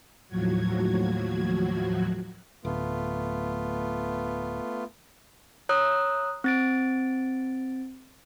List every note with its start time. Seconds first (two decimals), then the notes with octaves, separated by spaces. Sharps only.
0.28 D#2 A2 F3 F#3 F#4 G#6
2.65 D1 A3 B3 F4
5.69 C#5 A#5 D#6 E6 F#6
6.44 C4 A6 D7